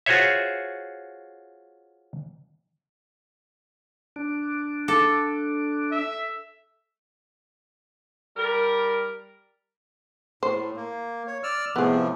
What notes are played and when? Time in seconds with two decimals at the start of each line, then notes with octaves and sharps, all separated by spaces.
0.06 F4 F#4 G#4 C5 C#5 E5
4.16 D4
4.88 A4 D6
5.92 E5
8.37 G3 A#4
10.43 A2 C5
10.76 A#3
11.27 C#5
11.43 D5 E6 F6
11.76 A2 C3 F3 B3 G#4